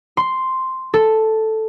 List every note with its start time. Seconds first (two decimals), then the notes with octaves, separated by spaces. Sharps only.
0.17 C6
0.94 A4